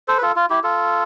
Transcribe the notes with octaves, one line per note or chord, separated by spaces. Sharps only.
A4 C5
B4
F4 A4
F4
E4 G4
F4 A4